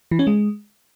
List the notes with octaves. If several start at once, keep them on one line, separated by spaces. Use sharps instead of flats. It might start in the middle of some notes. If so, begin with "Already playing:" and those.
E3
C#4
G#3